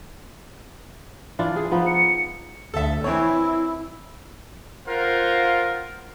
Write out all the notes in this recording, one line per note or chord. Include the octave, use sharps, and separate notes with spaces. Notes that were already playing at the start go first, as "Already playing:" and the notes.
E3 D4 F4
G#4
F3 B3 D#4
C#7
D2 A4 E5
E3 C4 E4 C#5
F4 A#4 C5 F5 F#5